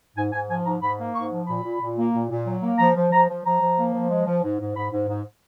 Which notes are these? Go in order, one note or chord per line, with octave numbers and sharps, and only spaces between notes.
G#2 G#5
G#2 G#5
F3 G#5
G#2 A#5
G#2 B5
A#3
G#2 C#6
F3
A#2 B5
A#2
A#2
A#3
A#2
A#2
F#3
A#3
F3 A#5
F3
F3 A#5
F3
F3 A#5
F3
A#3
F3
G#3
F3
G#2
G#2
G#2 B5
G#2
G#2